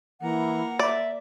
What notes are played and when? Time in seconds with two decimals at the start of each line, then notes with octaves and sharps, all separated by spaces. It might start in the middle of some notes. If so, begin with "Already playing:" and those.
0.21 E3 A#3 F#5 A#5
0.79 D5 E5